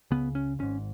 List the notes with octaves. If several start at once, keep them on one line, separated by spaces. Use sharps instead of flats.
C#2 C#3 B3
C#4
G#1 G#2 C#4